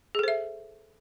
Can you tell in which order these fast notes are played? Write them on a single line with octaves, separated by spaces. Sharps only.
G#4 A4 C5 E5